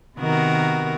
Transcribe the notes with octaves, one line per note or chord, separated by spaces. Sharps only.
C3 D#3 B3 F#4 A#4